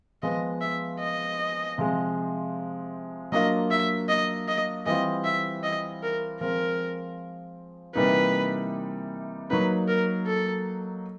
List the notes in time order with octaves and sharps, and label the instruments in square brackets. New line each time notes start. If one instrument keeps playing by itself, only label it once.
[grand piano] F3 G#3 B3 [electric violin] D#5
[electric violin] E5
D#5
[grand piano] C3 F3 G#3
[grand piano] F#3 A#3 D4 F4 [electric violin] D#5
[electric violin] E5
D#5
D#5
[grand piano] E3 G3 C4 F4 [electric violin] D#5
[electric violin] E5
D#5
A#4
[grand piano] F3 G#3 C4 [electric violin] A#4
[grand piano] C3 E3 G3 A#3 D#4 [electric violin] B4
[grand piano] F#3 A#3 D#4 [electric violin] B4
[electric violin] A#4
A4